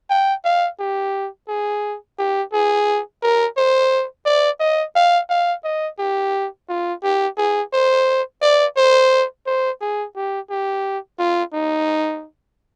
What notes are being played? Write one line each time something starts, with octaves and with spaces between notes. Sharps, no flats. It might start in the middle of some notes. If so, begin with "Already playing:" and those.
G5
F5
G4
G#4
G4
G#4
A#4
C5
D5
D#5
F5
F5
D#5
G4
F4
G4
G#4
C5
D5
C5
C5
G#4
G4
G4
F4
D#4